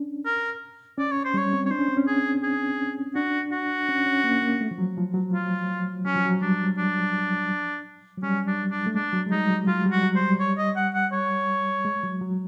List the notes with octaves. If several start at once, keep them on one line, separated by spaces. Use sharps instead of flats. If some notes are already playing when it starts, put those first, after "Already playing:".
Already playing: C#4 D4
A#4
C#4 D5
C#5
C5
G3
C#5
C4
C#5
D4 C5
C#4
C4
C#4
G#4
G#4
D4 F#4
F#4
C#4
C#4
A#3
A#3
A3
F3
F#3
F3
F#3
F4
F#3 C#4
F3
F#3
G3 D4
D4
F#3
G3 C#4
D4
D4
A3
G#3 D4
F#3
G#3
G3 D#4
F#3
F#3 F4
G3
F#4
F#3
C5
G3
C#5
D#5
F#5
F#5
C#5
G#3
F#3
F#3